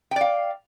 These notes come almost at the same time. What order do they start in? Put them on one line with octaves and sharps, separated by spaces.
G5 D5 F5